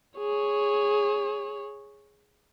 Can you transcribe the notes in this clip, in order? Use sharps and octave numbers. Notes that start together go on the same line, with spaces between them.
G#4 C#5